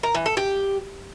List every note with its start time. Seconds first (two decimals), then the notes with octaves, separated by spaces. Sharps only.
0.03 A#4
0.15 E3
0.26 A4
0.37 G4